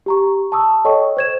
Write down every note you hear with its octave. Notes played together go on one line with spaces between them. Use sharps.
G4 A#5 C#6
A5 C#6 D#6 E6
A4 C#5 D#5 G5 C#6
C5 G#6 E7